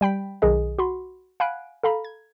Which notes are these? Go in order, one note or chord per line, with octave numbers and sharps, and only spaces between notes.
G3 G5 B5 B6
B1 D#3 G#4 D#5
F#4 B5 C6
F5 F#5 G#5 B5 F#6 D7
A4 F5 A#5 B5
G#6